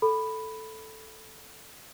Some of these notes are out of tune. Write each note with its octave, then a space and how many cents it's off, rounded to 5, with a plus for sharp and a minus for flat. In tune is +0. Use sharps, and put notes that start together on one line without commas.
A4 -5 B5 +0